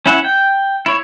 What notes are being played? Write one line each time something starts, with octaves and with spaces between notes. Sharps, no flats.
C#4 E4 E5 F#5
G5
E4 C#5